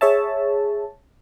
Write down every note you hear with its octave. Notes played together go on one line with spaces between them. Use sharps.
G#4 C#5 E5 A5